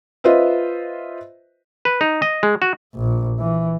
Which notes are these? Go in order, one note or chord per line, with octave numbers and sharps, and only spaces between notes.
F4 B4 C5 D#5 E5
B4
D#4
D#5
G#3
F#4
A#1
E3